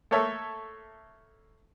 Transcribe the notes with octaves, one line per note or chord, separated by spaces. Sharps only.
A3 A#3 A4 C#5 E5